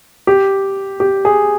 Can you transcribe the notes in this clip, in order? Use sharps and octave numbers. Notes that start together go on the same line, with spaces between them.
G4
G4
G#4